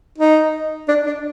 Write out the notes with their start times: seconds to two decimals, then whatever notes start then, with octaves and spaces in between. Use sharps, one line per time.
0.18 D#4
0.88 D4
1.06 D4